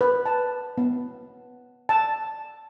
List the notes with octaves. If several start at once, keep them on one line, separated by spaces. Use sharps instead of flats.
B4
A5
B3
A5